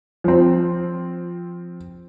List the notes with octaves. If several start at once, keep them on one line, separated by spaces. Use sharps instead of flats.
F3 C4